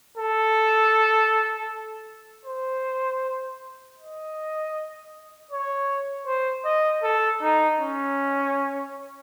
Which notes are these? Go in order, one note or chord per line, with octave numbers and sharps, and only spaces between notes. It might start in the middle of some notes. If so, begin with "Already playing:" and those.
A4
C5
D#5
C#5
C5
D#5
A4
D#4
C#4